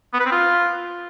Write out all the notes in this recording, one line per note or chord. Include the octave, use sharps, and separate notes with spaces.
B3
B4
C4
F4